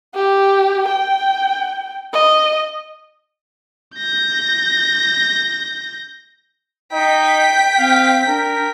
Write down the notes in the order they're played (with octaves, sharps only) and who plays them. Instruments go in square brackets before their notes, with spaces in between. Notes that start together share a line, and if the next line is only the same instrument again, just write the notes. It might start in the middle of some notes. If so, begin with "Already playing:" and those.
[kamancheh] G4
G5
D#5
[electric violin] G6 A#6
[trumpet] D#4 [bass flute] D#5 [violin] G5 B6
[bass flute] C4 [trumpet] F5
[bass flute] D4 [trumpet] A#4